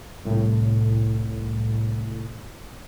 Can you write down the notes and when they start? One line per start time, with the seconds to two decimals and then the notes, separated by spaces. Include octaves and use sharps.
0.25 C2 A2